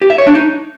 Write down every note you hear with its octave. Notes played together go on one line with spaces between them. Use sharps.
G4
E5
C#5
D4
D#4